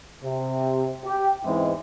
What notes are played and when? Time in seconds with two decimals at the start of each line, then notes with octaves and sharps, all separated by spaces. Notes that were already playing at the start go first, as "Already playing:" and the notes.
0.23 C3
1.05 G4
1.44 E2 G#2 E3 G#3 C4 E4